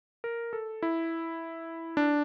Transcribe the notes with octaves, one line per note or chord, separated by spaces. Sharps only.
A#4
A4
E4
D4